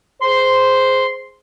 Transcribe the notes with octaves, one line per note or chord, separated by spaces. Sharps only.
G#4 C5 C6